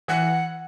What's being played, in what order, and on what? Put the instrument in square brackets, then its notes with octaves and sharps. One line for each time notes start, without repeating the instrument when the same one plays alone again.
[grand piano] E3 [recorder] F#5